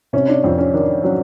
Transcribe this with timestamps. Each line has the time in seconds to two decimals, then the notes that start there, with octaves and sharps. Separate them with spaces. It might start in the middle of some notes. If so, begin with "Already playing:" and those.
0.13 C3 C#4
0.28 D4
0.44 F2 C4
0.58 C#4
0.74 D#3 D4
1.04 F#3 C#4